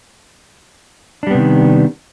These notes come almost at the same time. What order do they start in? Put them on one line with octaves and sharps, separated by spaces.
D4 G3 B3 C3 D#3